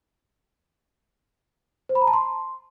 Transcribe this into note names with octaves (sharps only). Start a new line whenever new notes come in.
C5
B5
A#5
A5
C6